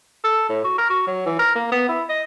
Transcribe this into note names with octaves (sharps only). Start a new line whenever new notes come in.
A4
A2
F#4
A#4
F#4
F#3
E3
A#4
A#3
B3
E4
D#5